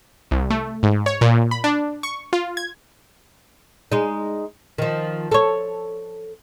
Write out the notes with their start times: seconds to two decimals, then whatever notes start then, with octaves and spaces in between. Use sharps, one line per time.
0.31 C2
0.50 A3
0.83 G#2
1.06 C#5
1.21 A#2
1.51 B5
1.64 D4
2.03 C#6
2.33 F4
2.57 G#6
3.92 G#3 D#4
4.78 D#3 F3
5.31 A4 C#5